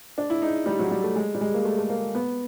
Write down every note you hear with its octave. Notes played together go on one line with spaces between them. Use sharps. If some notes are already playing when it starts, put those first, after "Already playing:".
D4
E4
D#4
G3
F#3
G3
A3
G#3
G3
G#3
A#3
A3
A3
A#3
B3